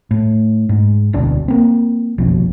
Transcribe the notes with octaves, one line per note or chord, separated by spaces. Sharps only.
A2
G#2
D1 B1 D4
A#3 C4
F#1 B1 F2